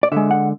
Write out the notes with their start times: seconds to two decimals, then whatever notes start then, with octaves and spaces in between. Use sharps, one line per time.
0.03 D5
0.12 D3 G#3 E5
0.31 F#5